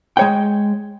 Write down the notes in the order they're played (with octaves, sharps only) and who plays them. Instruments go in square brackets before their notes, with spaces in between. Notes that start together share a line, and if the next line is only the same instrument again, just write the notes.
[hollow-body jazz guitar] G#3 C#5 G5